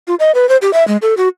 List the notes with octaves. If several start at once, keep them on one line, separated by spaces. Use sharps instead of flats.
F4
D#5
B4
C5
G4
E5
G#3
A4
F#4